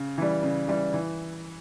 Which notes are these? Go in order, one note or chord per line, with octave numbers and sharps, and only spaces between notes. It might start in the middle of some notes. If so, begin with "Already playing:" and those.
Already playing: C#3
E3 G3
C#3
E3 G3
E3